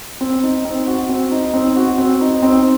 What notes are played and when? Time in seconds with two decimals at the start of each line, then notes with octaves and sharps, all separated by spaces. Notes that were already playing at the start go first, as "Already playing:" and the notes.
0.21 C4
0.43 D#4
0.65 C4
0.87 F#4
1.09 C4
1.32 D#4
1.54 C4
1.76 F#4
1.98 C4
2.21 D#4
2.43 C4